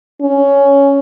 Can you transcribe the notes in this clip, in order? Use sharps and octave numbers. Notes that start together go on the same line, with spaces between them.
C#4